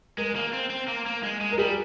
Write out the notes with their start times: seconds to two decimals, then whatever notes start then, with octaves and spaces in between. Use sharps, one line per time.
0.17 G#3 A#4
0.36 A#3
0.53 C4
0.70 C4
0.88 A#3
1.06 A#3
1.23 G#3
1.41 G#3
1.52 A#4
1.58 G3 G#4